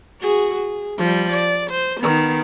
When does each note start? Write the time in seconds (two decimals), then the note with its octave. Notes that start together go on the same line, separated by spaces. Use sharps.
0.21 F#4 G#4
0.55 G#4
0.98 F3 G3
1.31 D5
1.70 C5
2.00 D#3 B3